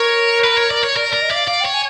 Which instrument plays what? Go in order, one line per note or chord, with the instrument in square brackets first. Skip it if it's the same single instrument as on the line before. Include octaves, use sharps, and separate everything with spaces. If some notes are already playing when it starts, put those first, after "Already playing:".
Already playing: [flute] A#4 [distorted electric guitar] C#5
[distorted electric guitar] B4
C#5
D5
C#5
[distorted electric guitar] A#4 [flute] D5
[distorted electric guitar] A#4 [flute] D5
[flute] D#5
E5
[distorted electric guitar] D5 [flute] F5
[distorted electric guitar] D5 [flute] F5
[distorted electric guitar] C#5 [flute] G5
[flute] G#5